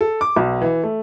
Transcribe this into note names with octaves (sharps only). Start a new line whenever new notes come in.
A4
D6
B1
E3
A3